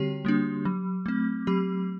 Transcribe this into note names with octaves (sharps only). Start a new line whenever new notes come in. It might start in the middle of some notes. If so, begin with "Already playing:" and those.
Already playing: D3 G3 C4 F#4 G4 C#5
G3 A#3 D4
F#3
A3 C4
F#3 G4